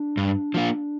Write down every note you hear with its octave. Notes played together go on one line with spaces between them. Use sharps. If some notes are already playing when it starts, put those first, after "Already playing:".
Already playing: D4
G2
F3 A#3 F4